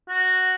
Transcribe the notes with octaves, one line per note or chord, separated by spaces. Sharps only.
F#4